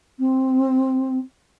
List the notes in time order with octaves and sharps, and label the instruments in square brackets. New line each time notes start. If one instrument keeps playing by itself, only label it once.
[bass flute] C4